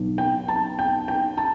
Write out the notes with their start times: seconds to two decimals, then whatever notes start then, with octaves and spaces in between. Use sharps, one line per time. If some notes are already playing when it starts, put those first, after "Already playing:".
Already playing: B1 B2
0.18 G5
0.48 A5
0.79 G5
1.08 G5
1.38 A5